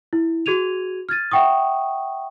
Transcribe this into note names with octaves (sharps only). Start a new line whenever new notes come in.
E4
F#4 G#4 G#6 D#7 F7
F6 G#6 A6 D#7
E5 F#5 G5 C#6 D#6